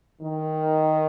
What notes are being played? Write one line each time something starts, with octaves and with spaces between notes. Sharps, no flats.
D#3